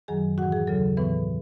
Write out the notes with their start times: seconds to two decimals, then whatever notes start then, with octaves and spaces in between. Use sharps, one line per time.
0.08 F#2 D#3 F#3 G#4 G#5
0.38 A2 F#4 F#5
0.43 E3
0.52 G#4
0.67 D#2 C#3 F#3 A4
0.97 A2 E3 B3 B4